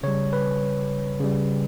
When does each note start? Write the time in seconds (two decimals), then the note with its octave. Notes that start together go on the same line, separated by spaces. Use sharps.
0.03 C#3 G3 C#5
0.33 B4
1.20 C#3 G3